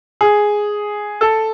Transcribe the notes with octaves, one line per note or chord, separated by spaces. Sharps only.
G#4
A4